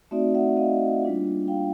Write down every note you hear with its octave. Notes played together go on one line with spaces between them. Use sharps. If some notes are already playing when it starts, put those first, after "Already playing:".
A3 C4 D#4 F#4 D5 E5
E5 F#5
D#5 F5
G3 A#3 D4 F4
F5 G5